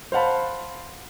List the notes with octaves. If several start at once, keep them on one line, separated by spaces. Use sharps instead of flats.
C5 F5 F#5 A5 B5